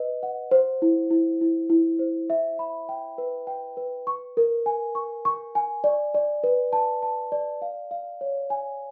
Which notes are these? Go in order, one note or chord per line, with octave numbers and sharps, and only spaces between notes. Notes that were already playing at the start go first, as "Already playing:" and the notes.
Already playing: B4 D#5
F#5
C5
E4
E4
E4
E4
C5
E5
B5
G5
B4
G5
B4
C#6
A#4
G#5
C#6
C#6
G#5
D5
D5
B4
A5
A5
D5
F5
F5
C#5
G#5